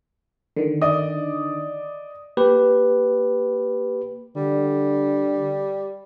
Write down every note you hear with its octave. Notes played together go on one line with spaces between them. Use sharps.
D3 D#3
D5 D#5 D#6
A#3 G4 B4
D3 G3